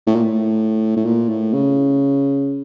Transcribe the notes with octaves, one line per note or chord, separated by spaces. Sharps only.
A2
A#2
A2
A2
A#2
A2
C#3